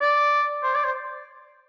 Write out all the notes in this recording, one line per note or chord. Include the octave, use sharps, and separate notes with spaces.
D5
C5
D5
C5